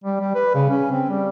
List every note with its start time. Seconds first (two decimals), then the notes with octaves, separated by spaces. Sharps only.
0.04 G3
0.20 G3
0.35 B4
0.55 C#3
0.70 C#4
0.92 C4
1.09 G3